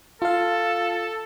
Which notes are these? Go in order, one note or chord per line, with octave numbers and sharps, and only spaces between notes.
F4 A4 F5